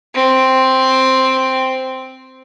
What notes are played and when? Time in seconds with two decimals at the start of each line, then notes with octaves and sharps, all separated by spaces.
0.15 C4